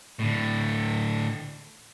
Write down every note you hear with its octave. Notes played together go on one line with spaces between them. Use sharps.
A2 D3